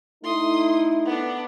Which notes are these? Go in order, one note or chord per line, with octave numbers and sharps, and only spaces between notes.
A3 D#4 E4 C6 D#6
B3 D4